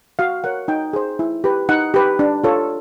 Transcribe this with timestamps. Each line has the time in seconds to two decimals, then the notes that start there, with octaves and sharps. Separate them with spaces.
0.19 F#4 F5
0.44 A#4 C#5 F#5
0.68 D#4 G5
0.93 G#4 C5
1.19 E4
1.44 G4 B4
1.69 D#4 F#5
1.94 G4 B4
2.19 D4
2.44 F4 A4 C#5